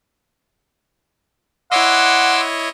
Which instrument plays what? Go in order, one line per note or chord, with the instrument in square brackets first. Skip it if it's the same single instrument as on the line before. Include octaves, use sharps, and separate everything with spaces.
[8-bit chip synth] E4 C#5 D#5 [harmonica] F#5 [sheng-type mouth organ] C6 D6 E6